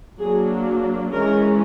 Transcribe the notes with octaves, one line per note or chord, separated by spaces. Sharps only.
F#3 A#3 D4 G#4
E3 G#3 C#4 A#4